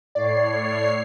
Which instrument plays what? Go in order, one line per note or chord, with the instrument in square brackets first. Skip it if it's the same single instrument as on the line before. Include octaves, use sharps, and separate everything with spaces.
[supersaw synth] A2 C#5 C7 [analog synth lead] D5